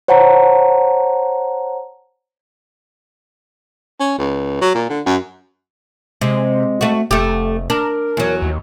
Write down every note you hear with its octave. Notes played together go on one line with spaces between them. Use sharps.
C5 C#5 F#5 A5 A#5
C#4
C#2
F#3
A#2
D3
F#2
C3 G#3
A3 F#4
F1 A3 G4
D4 A#4
E2 F#3
D#2